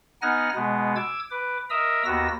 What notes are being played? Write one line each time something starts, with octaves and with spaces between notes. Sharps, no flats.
B3 D#4 F#5 G#5 F6 A#6
B2 G#3 B3
D6 E6 G#6
B4 D6
A#4 D#5 E5 A#5 D#6 E6
D#2 B3 F#4 E6 A#6